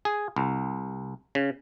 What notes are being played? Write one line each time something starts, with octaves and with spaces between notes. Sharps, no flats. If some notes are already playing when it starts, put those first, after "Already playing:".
G#4
C2
C#3